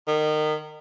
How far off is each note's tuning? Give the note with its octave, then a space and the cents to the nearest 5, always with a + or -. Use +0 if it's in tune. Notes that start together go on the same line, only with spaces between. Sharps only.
D#3 -25